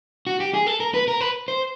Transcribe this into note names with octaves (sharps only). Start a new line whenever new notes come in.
F#4
G4
G#4
A4
A#4
B4
A#4
B4
C5